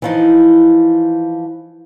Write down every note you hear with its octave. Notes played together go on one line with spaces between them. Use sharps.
E3 F3 D#4